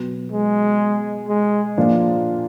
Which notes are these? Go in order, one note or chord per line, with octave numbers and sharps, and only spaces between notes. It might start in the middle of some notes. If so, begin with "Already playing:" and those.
Already playing: B2 F#3 B3
G#3
G#3
A#2 F3 A#3 D4 F4